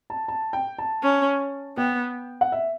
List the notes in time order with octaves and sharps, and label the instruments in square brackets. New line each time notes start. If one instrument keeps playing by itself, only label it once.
[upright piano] A5
A5
G5
A5
[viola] C#4
[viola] B3 [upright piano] G5
[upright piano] F#5
E5